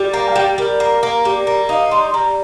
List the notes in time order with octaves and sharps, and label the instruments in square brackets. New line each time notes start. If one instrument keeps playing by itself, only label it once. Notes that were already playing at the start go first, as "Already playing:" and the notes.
Already playing: [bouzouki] G3
[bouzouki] A#3 [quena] A#5
[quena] F5
[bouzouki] G3 [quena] G5
[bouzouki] G3 [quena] A#4
[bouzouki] A#3
A#3
G3
A#3
[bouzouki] D#4 [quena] F5
[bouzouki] G3 [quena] C6
[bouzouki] G3 [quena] A#5